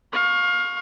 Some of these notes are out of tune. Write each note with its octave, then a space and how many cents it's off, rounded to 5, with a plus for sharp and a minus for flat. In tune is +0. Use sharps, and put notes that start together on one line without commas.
F5 +25 C#6 +0